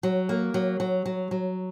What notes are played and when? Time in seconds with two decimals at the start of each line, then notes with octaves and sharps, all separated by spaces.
0.03 F#3
0.29 A#3
0.54 F#3
0.80 F#3
1.05 F#3
1.31 F#3